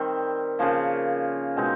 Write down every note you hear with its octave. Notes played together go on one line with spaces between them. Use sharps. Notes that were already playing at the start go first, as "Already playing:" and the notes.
Already playing: D#3 G3 C4
C#3 F3 A#3
B2 G#3 C4 D#4